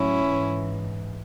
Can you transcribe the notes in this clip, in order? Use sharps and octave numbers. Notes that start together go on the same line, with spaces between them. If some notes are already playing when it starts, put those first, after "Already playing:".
Already playing: A2 F#3 C#4 E4
G#2 E3